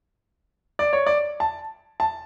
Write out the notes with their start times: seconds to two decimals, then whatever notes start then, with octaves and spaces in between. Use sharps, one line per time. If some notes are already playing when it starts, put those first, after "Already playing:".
0.79 D5
0.93 C#5
1.06 D5
1.40 A5
2.00 A5